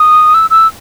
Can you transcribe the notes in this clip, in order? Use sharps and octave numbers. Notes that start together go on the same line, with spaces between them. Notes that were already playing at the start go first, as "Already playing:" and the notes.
Already playing: D#6
E6
E6